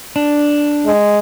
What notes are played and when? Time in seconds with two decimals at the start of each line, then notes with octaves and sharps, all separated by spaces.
0.16 D4
0.86 G#3